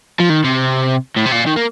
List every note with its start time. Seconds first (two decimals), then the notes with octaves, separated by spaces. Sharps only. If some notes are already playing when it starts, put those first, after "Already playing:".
0.20 F3
0.30 D#3
0.44 C3
1.16 A2
1.26 C3
1.32 A#2
1.46 D#3
1.56 A#3